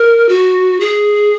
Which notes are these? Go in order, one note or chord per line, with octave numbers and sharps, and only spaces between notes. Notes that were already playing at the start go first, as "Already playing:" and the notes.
Already playing: A#4
F#4
G#4